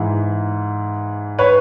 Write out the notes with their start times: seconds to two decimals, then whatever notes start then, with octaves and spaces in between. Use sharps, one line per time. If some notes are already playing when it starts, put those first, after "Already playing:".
Already playing: G#2 E3
1.39 B4 C#5